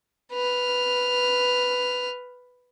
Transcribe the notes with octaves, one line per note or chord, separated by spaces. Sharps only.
B4 F6